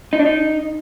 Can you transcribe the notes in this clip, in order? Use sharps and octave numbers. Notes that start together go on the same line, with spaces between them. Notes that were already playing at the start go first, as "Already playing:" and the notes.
D#4
D4
D#4